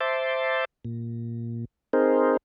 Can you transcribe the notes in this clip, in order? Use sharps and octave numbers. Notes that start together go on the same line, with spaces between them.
C5 E5 A5 C6 D6
A#2
C4 D#4 G#4 A#4 C5